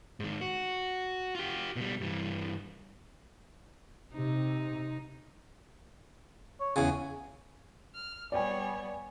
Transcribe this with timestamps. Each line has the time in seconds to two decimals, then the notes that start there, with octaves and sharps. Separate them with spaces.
0.20 G#2 D#3
0.41 F#4
1.35 F4 G4
1.76 B2 G3
2.01 G2 E3
4.14 C3 D#4
6.60 C#5
6.76 E2 C#3 G#5
7.93 F6
8.32 G3 B3 C#5 D5 G5 G#5